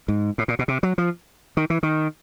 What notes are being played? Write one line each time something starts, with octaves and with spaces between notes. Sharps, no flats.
G#2
A2
A#2
B2
C3
F#3
F3
D#3
E3
D#3